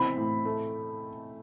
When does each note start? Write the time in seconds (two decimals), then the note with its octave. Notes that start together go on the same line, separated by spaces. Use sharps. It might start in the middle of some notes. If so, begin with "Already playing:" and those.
Already playing: E3 C4 B5
0.17 A2
0.45 A3